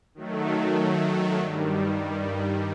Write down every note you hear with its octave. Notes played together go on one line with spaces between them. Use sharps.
D#3 F#3 A3
G2 D#3 G3